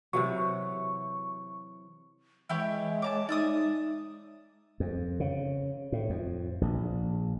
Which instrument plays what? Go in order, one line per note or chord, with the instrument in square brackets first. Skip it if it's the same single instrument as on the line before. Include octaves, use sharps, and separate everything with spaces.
[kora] C3 E3 F#3 [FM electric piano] C#6
[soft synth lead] E3 [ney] G#3 [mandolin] E4 G4 C#5
[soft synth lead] C#5 [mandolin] A5 A#5 D6
[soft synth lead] D#4 [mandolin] D5 E5 D#6
[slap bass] F2
C#3
A2
F2
A#1